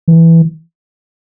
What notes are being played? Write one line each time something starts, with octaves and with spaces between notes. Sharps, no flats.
E3